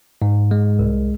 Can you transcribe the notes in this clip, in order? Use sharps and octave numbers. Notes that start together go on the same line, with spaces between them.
G#2
G#3
C2